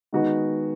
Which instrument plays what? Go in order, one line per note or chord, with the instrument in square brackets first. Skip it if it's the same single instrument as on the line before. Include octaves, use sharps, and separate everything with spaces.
[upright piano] D#3 G#3 B3 D#4 F#4